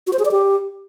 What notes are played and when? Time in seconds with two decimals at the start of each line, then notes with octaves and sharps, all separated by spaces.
0.07 F#4
0.13 C5
0.19 G#4
0.25 D5
0.31 G4